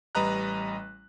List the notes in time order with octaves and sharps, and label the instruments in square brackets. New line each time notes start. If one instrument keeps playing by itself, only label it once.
[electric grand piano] A1 G3 B4 D#5 A#5 F#6